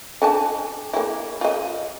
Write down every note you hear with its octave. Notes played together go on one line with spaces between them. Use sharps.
D3 G#5 A5
A#3 E4
F4 D#5